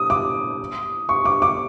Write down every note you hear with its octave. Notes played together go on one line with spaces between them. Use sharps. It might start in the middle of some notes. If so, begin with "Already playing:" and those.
Already playing: D#6
D6
C#6
D6
D6